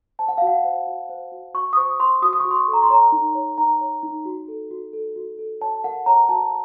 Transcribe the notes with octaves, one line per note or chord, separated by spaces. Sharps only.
C5 A5
F#5
F#4 F5
F#5
C5
F#4
C5
F#4
F#4 C#6
D#6
C5 C#6
C5 C6
F#4 D#6
D#6
C#6
F#4
C6
C#6
A4
A#5
C6
C#5 A#5
D#4
C#5
D#4 A#5
C#5
D#4
F#4
A4
F#4
A4
F#4
A4
C#5 A5
A#4 F#5
C#5 A#5
F#4 A5